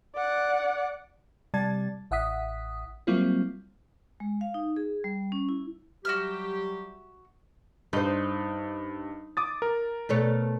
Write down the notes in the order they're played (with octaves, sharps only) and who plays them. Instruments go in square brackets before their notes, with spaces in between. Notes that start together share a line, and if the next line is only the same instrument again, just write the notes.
[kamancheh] D5 F#5
[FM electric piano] C3 G3 D5 A5 G#6 A6
A1 E5 F#5 D#6 B6
F#3 G3 A#3 C4 E4 F4
[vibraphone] G#3
F5
D#4
G#4
G3
C#4
E4
[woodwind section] F#3 G3 G4 [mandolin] F#4 E5 F6
[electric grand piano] G2 [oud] D#4 C5
[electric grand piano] D6 D#6 A6
A#4
[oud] B2 A3 C#5